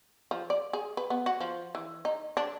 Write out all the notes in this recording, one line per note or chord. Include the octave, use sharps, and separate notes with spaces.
F3
D5
G#4
B4
B3
F#4
F3
E3
D#4
D4